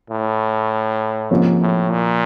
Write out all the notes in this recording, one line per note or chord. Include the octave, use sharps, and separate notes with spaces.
A2
G#2 C3 F3 A#3 C#4
A2
A#2